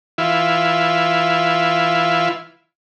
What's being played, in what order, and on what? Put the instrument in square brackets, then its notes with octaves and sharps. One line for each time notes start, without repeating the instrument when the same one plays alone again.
[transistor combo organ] E3 E4 F4